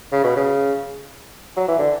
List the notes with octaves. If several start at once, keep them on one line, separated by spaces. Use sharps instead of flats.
C#3
B2
C#3
F#3
E3
D3